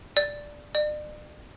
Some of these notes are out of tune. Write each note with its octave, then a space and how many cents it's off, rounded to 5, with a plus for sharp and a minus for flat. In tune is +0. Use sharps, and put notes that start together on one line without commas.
D5 +0
D5 +40